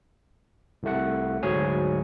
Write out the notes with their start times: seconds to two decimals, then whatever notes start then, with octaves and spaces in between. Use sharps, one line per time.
0.83 C2 C3 A3 F#5
1.43 D2 G#2 F#3 G#4 C#5 G#5